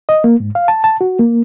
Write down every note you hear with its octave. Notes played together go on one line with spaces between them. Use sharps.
D#5
A#3
G#2
F5
A5
A5
F#4
A#3